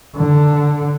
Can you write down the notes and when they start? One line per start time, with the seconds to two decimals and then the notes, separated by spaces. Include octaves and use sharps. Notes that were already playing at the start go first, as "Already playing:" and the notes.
0.17 D3